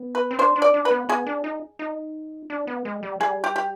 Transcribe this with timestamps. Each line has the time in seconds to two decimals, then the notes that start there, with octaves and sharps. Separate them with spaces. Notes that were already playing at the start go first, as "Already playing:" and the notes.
Already playing: B3
0.15 B4
0.31 C4
0.38 D4 C5
0.56 D4
0.62 D5
0.74 D4
0.85 B4
0.91 B3
1.09 B3 G#4
1.27 D4
1.44 D#4
1.79 D#4
2.50 D4
2.67 B3
2.85 G#3
3.03 G3
3.20 G3 G#4
3.44 G4
3.56 G4